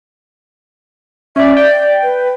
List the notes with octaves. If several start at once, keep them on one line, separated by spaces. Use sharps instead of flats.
C#4 D5 E5
D5 G5
B4